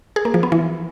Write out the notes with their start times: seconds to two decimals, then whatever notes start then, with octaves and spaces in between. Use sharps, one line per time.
0.16 G#4
0.25 A#3
0.34 F3
0.43 B3
0.52 E3